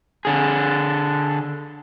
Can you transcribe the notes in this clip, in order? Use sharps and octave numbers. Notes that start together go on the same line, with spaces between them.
D3 G#4